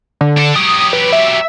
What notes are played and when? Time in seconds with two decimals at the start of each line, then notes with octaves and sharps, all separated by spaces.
0.21 D3
0.38 D4 A4
0.56 F#3 G4 D#6
0.93 B4
1.12 E5